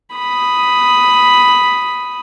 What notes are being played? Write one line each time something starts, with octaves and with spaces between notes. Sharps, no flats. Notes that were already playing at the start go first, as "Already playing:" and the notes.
B5 D#6